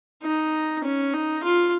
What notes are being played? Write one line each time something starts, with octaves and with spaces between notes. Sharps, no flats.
D#4
C#4
D#4
F4